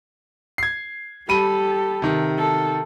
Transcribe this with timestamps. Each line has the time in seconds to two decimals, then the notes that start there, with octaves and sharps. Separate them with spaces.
0.58 G#6 C7
1.29 G3 G4 A4 B5 D#7
2.02 C3 D#3
2.38 A4